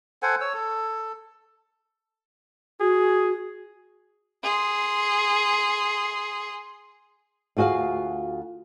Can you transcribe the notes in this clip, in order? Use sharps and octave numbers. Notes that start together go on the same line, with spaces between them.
A4 C5 F#5 G#5
C#5 E6
A4
F#4 G#4
G#4 C6
D2 F4 F#4 G#4 F5